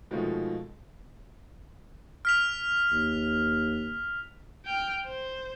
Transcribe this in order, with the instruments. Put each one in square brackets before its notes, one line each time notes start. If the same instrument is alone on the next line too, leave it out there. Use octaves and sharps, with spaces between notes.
[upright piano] B2 D#3 F3 G#3 A3
[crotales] F6 B6 F7
[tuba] D#2
[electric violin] G5 F6
C5